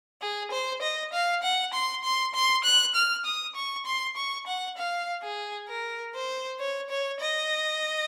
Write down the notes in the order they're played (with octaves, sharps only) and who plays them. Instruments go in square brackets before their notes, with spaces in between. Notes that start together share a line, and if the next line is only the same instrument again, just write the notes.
[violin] G#4
C5
D#5
F5
F#5
C6
C6
C6
F#6
F6
D#6
C#6
C6
C#6
F#5
F5
G#4
A#4
C5
C#5
C#5
D#5